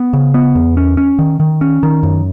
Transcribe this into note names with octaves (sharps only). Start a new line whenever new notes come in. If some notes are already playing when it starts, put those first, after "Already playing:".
Already playing: B3
C#3
B3
E2
C#4
C#4
D#3
D#3
C#4
D#3
F#2